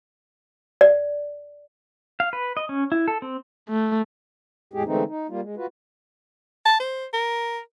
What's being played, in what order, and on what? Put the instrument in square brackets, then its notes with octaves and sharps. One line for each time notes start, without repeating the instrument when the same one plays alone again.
[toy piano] D5
[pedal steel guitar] F5
B4
D#5
C#4
E4
A4
C4
[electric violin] A3
[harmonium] E2 A2 G#3 G4 G#4
D3 E3 G#3 A3 C4 D#4
D#4
G3 A#3 F4
G#3
F4 F#4 B4
[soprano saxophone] A5
C5
A#4